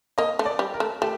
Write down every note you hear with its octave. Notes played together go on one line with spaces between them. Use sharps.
A#3 D#5
A3
D5
G3
A#4
A3
A3 G4